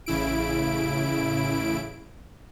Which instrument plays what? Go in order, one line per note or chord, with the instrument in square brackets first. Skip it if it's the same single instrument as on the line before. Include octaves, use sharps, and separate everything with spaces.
[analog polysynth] A1 C#3 E4 D7